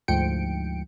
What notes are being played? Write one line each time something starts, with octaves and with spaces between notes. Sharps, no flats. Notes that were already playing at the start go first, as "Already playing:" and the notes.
D2 G#2 F3 G5 C#7 D7